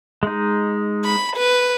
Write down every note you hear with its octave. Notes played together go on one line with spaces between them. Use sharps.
G#3 D#4
B5
B4